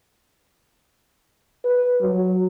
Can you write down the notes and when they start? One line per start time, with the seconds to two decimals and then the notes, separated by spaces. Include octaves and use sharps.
1.64 B4
2.01 F#3